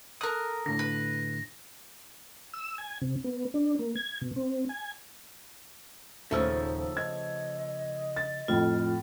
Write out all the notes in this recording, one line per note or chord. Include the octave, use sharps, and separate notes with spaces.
A4 A#4 D#6 F#6
A2 D3 A#6
B4
E6
G#5
C3
B3
D4
A#3
G#6
B2
C4
G#5
D#1 C#3 F3 A3 D#4 E6
D#5 G#6
A6
F2 A2 F4